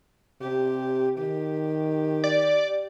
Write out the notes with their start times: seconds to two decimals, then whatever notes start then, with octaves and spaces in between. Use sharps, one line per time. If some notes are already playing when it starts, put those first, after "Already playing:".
0.41 C3 G4
1.18 D#3 G4
2.24 D5